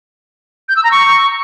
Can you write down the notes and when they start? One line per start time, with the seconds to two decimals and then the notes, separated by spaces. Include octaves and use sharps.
0.69 G6
0.76 E6
0.84 A#5
0.91 C#6